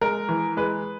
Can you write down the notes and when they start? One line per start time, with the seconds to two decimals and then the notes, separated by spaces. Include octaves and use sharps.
0.01 G#3 A#4
0.29 E3
0.57 G#3 B4